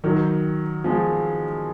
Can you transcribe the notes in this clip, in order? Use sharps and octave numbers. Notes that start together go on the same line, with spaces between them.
D#3 F#3
F3 G#3